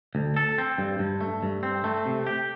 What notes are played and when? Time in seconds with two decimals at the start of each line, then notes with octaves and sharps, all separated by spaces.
0.15 D2
0.36 A4
0.58 C4
0.78 G2
0.99 G2
1.21 A3
1.43 G2
1.63 C4
1.84 A3
2.06 C3
2.27 G4